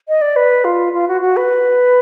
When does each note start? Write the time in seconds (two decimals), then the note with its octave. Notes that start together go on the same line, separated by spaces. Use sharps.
0.08 D#5
0.22 D5
0.36 B4
0.64 F4
0.93 F4
1.08 F#4
1.21 F#4
1.37 B4